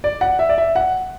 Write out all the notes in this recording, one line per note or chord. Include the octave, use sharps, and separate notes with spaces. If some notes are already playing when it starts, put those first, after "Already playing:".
D5
F#5
E5
D5
E5
F#5